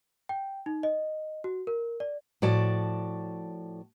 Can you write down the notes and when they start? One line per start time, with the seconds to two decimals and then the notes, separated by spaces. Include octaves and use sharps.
0.29 G5
0.66 D#4
0.83 D#5
1.44 F#4
1.67 A#4
2.00 D5
2.42 A2 F3 F#4 C#5 D5 A5